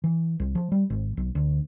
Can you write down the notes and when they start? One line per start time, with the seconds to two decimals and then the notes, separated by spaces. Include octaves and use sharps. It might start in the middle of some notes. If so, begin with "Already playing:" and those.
0.04 E3
0.40 C2
0.55 F3
0.72 G3
0.90 G#1
1.17 B1
1.35 D2